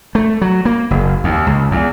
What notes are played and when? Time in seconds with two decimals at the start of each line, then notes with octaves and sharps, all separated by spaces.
0.15 A3
0.41 F#3
0.65 A#3
0.91 F#1
1.24 D#2
1.47 C#2
1.71 E2